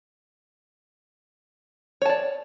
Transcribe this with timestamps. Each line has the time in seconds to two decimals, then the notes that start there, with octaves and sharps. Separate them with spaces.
2.02 C#5
2.06 A5
2.09 D5